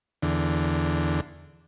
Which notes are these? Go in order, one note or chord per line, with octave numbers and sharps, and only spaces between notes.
E2 D3